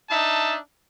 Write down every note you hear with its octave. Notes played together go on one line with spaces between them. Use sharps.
D4 D#4 E5 A5